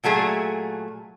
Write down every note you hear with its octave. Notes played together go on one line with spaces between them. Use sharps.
A#2 F#3 A3 G#4